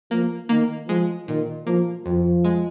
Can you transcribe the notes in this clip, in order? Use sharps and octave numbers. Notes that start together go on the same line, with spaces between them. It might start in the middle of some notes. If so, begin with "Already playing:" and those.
F3 A#3
D#3 A#3
F3 G#3
A#2 D#3
F3 A#3
F2 F3
G#3